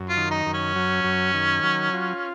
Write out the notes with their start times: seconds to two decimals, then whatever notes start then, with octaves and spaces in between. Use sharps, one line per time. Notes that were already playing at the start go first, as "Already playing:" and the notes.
Already playing: F#2
0.09 F4
0.17 D#3
0.31 D#4
0.46 F#2
0.54 C#4
0.76 F#3
1.04 F#2
1.34 D#3
1.63 F#3
1.93 F4